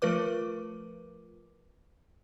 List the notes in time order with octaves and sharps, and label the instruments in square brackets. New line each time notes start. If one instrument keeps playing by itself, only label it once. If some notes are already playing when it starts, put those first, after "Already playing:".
[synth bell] F3 A3 F4 A#4 B4 D6